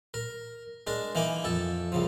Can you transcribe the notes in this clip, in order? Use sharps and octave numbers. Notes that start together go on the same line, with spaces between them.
A#4
G#3 D4 A#4
E3 A#3 D#4 G#5 D6
F2 A4
C2 C#3 F3